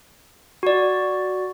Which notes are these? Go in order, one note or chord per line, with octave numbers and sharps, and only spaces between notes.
F#4 D5